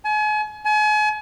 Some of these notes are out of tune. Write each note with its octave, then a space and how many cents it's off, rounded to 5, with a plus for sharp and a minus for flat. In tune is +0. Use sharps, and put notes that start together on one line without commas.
G#5 +35
G#5 +35